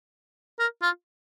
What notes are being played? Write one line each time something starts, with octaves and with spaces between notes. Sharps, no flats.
A#4
F4